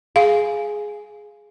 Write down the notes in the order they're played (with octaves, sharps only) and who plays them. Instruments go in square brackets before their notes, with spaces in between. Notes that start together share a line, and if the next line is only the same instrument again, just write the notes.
[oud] G#4 [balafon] F5